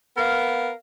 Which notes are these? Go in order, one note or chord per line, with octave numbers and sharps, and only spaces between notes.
B3 A#4 F5